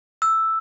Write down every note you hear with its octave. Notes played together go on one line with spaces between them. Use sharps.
E6